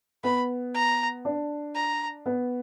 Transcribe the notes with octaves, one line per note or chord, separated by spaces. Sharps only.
B3 B5
A#5
D4
A#5
B3